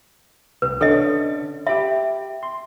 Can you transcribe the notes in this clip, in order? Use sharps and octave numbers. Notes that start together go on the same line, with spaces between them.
C2 B4
D3 C#4 D4 A4 D#5
G4 E5 B5
C6